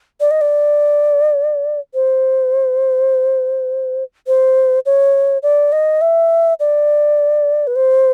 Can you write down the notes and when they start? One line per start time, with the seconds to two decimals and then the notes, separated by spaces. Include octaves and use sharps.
0.20 D5
0.31 D#5
0.41 D5
1.94 C5
4.27 C5
4.86 C#5
5.43 D5
5.72 D#5
6.01 E5
6.60 D5
7.67 B4
7.76 C5